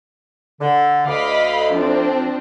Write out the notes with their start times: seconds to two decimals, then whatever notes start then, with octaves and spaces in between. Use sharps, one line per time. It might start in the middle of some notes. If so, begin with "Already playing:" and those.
0.60 D3
1.07 D2 D#5 F5 B5 D6
1.73 F3 C4 D4